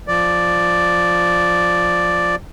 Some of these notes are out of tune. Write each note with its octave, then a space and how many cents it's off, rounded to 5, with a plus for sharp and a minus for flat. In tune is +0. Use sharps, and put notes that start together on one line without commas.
F3 +0 D5 +0